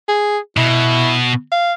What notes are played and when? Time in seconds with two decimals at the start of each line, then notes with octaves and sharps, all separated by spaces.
0.08 G#4
0.57 B2 E4
1.52 F5